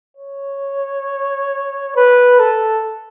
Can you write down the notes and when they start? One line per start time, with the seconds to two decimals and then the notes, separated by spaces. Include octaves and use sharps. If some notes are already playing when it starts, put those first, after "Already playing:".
0.17 C#5
1.96 B4
2.39 A4